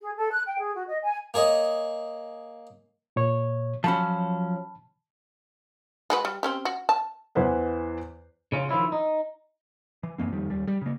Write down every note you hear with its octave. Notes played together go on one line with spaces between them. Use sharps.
G#4
A4
F#6
G5
G#4
F#4
D#5
G#5
A#3 G#4 C#5 D#5
A#2 C#5
F3 F#3 C#4 A5 B5
G#3 F#4 B4
G3
C4 C#4 G4
F#4
A5
E2 E3 B4 C5 F#5
C#3 C#4 F4
D#3 F3 E4 F4
D#4
E3
F#2 E3 A#3 C4
F2 D#3 G3
D#2 G3
G3
C#3 A#3